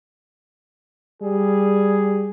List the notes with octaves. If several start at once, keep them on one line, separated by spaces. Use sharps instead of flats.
G3 G#4